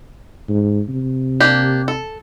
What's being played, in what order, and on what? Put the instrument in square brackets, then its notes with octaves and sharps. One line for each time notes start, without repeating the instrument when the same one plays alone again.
[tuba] G#2
C3
[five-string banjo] A#3 D4 G4
A4